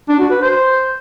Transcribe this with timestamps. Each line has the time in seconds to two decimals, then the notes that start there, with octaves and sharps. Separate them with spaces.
0.09 D4
0.20 F#4
0.31 B4
0.42 C5